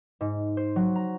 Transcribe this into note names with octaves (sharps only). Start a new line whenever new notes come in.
G#2
C5
F#3
A#5